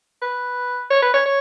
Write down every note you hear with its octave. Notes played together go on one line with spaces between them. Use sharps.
B4
C#5
B4
C#5
C#5